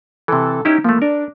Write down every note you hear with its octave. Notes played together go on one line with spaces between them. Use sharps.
C3 E3 A4
C#4 D#4 E4 G4
F3 A3 A#3
D4 A#4